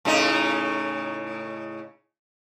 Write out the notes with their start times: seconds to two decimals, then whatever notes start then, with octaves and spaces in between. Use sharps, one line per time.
0.05 A2 C#3 D#4